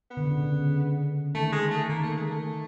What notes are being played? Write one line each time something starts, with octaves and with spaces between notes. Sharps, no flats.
B3
D3
C#3
C#3
D3
D#3 A3
G#3
A3
D#3 A#3
A3
G#3
A3